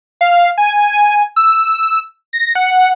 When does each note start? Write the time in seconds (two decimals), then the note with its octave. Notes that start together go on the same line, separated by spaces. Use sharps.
0.21 F5
0.58 G#5
1.36 E6
2.33 A#6
2.55 F#5